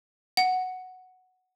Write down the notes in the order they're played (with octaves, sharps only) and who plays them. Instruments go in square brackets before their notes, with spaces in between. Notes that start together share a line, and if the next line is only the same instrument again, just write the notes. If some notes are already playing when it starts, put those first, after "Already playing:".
[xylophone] F#5